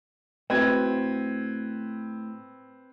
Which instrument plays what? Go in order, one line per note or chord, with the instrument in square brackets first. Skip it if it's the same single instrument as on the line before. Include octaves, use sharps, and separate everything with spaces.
[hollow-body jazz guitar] A2 F#4 E5 [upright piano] C4 B4 G#6